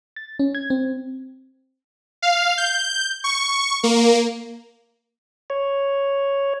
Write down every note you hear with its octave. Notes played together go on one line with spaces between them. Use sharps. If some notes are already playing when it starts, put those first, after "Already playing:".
A6
C#4
G#6
C4
F5
G6
C#6
A#3
C#5